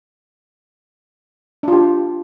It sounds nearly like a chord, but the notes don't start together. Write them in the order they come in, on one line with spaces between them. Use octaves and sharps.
D4 F4 G4